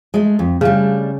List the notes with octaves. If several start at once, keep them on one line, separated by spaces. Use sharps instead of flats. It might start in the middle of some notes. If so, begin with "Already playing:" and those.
G#3 A3
F2
C#3 G3 A3 D4